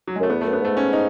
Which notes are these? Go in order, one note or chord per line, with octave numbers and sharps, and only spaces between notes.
F#3
G#3
F#2 A3
E2 B3
F#2 A3
B3
G#2 A3
C#4
D#4